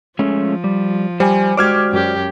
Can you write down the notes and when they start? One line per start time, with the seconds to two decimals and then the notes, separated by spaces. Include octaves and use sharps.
0.19 F3 G#3 A3 C#4
0.64 G3
1.20 G3 C5 G#5
1.57 G#3 F#4 G4 C5 D5 D6 F6 G#6
1.91 F#2 G4